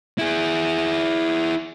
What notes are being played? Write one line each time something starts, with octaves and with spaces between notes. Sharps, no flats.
E4 G#4